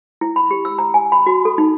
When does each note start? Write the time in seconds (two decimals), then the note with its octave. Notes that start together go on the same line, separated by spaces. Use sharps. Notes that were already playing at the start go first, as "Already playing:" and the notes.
0.21 E4
0.36 B5
0.51 G4
0.65 E6
0.79 A#5
0.94 G#5
1.12 B5
1.27 F#4
1.45 A4
1.58 D#4